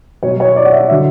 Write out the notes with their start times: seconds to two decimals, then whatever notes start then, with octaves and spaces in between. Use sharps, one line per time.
0.23 B2 F#3 C#5
0.40 C#5
0.56 D5
0.65 F#5
0.73 E5
0.90 D3 F#3 E5